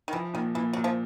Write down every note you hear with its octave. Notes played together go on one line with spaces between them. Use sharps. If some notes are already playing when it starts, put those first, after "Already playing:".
D#3
E3 F3
A#2 D#3
A#2 E3
A#2 F#3
F3